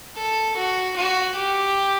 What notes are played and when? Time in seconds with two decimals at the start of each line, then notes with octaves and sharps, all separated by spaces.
0.16 A4
0.56 F#4
0.96 F#4
1.36 G4